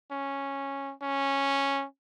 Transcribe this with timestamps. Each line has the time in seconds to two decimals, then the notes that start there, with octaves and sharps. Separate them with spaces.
0.11 C#4
1.02 C#4